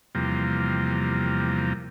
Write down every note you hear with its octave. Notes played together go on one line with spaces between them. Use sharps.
E2 C3 F3 G3 A#3